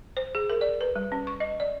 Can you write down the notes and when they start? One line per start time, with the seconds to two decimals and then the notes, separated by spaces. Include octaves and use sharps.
0.17 C5
0.35 G#4
0.50 A#4
0.61 D5
0.81 B4
0.96 G3
1.12 C#4
1.27 C#6
1.40 D#5
1.60 D5